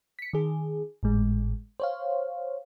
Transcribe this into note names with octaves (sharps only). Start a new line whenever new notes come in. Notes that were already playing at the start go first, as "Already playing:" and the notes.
B6 C#7
D#3 G#4
G#1 A2 G#3
C5 C#5 F5